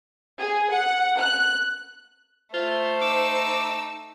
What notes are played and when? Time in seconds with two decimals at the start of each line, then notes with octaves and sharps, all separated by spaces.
0.39 G#4
0.72 F#5
1.19 F#6
2.54 A3 F4 C5
3.01 D#4 D6 E6